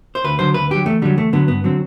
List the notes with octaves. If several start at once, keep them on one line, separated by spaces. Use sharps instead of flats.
C5
D2 B4
D3 F#3 C5
D2 B4
D3 F#3 G4
E2 A3
D3 F#3 G3
E2 A3
D3 F#3 B3
G2 B3
D3 F#3 C4